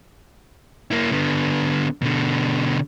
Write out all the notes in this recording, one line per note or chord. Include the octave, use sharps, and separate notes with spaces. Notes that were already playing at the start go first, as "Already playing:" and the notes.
A#3 E4
D3 B3
B2 D3